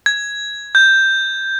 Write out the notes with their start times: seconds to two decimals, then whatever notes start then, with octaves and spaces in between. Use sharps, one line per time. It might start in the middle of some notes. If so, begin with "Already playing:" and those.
0.06 G#6
0.75 G6